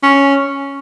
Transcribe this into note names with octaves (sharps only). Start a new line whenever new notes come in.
C#4